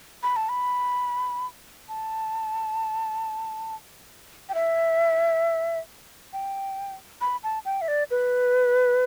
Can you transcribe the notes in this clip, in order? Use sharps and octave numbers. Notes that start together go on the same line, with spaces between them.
B5
A5
B5
A5
G5
E5
G5
B5
A5
G5
E5
D5
B4